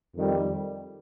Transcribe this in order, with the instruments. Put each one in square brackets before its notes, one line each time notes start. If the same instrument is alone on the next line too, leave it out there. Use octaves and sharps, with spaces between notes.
[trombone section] F2 D#3 G3